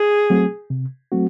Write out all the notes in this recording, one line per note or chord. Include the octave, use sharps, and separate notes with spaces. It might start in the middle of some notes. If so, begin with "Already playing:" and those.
Already playing: G#4
F#3 A3 C4 F#4
C3
F#3 A3 C4 F#4